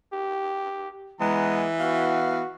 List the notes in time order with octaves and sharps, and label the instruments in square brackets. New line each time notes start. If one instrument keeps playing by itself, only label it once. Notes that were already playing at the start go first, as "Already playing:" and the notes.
[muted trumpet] G4
[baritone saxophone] E3 [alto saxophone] G#3 [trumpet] B3 [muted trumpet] A#5
[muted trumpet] B3 [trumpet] F#4 [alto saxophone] F5